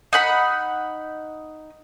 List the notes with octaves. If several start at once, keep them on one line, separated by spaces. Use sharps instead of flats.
D#4 F#5 B5